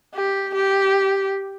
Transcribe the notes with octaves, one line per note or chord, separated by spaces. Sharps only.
G4
G4